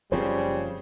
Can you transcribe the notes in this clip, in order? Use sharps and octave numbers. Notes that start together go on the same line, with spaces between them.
F#1 C#3 F3 G3 C4 C5